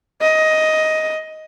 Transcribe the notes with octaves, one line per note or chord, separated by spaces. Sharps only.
D#5